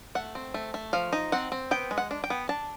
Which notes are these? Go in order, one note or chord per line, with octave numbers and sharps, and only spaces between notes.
A3 F#5
C4
A3
A3
F3 F5
D#4
C4 F#5
C4
B3 G5
G#3
F#5
D4
G5
B3
D4 A5